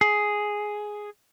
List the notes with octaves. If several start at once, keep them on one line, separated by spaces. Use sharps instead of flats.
G#4